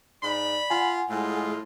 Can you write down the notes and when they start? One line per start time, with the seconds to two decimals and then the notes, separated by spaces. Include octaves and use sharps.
0.23 G#2 D5 B5
0.70 F4 F#5 G#5
1.09 A2 G#3 F4